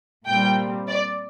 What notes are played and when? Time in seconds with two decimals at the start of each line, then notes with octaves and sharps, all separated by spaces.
0.26 A#2 G3 C4 G5
0.88 D5